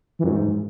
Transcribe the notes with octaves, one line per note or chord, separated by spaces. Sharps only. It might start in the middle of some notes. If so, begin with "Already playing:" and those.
E3
F#2
G#2